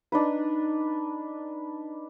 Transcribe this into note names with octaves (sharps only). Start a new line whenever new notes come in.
D4 D#4 B4